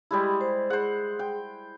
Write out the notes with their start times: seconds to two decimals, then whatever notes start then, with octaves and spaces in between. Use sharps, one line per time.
0.11 G3 G#3 E4 G4
0.41 C5
0.70 G#4 C5 F#5
1.19 G5